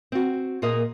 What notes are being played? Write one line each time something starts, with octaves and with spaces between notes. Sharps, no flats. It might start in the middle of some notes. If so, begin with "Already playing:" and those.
C4 F#4
A#2 A#3 G#4 A#4 D#5